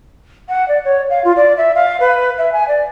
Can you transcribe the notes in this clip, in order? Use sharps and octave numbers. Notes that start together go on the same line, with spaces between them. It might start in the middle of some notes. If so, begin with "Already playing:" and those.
F#5
D5
C#5
F5
F4
D5
E5
F5
B4
E5
G#5
D5